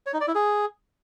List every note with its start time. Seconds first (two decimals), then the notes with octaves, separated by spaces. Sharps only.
0.06 C#5
0.14 D#4
0.21 D5
0.28 E4
0.35 G#4